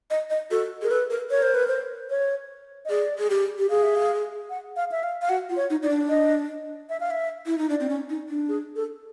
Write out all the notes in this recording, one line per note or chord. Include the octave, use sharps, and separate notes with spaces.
D#5
D#5
F#4 A4
G#4 A#4
A4 B4
A#4
A#4 C#5
C5
B4
C5
C#5
D#5
G#4 D5
G#4
G4
G4
G#4 F5
E5
F5
F#5
F5
E5
F5
F5
F#4 F#5
F4
C#5
D#4
D#4 D5
D4
D#5
E5
F5
E5
E4
D#4
D4 D5
C4
C#4
D#4
D4
G#4
A4